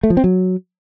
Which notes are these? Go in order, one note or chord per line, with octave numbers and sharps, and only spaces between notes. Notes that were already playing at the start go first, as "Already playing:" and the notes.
A3
F3
C4
F#3